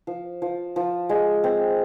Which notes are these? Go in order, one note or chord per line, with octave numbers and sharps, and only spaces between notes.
F3
F3
F3
G#3
C4